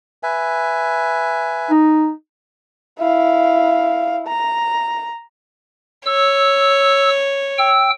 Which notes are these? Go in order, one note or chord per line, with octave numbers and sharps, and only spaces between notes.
B4 E5 G#5
D#4
E4 F5
A#5
C#5 E6
G5 E6